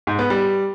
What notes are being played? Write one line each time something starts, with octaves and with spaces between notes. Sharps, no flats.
G#2
B3
G3